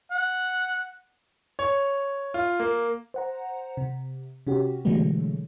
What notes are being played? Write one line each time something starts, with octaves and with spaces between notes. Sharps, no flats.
F#5
C#5
F4
A#3
C5 F#5 A#5
C3
C3 C#4 F#4 G4
B2 D3 E3 F#3 G#3 A3